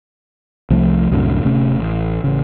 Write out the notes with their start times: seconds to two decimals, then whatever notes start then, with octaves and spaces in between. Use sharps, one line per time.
0.70 C2 F3 A3
1.11 C2 F#2 A2 D3
1.44 D1 C3 A3 C#4
1.79 A1
2.24 A1 C#3